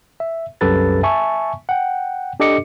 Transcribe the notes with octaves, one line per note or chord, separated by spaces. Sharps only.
E5
C2 F#2 G4 A4 B4 A6
E5 G#5 A5 C#6
F#5 G5
D4 G4 A4 D#5 D6 C#7